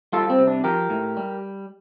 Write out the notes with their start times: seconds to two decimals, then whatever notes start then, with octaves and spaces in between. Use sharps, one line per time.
0.12 G3 F4 A4
0.30 C4
0.39 C3
0.47 D4
0.64 F3 G4 A#4
0.90 A2
1.17 G3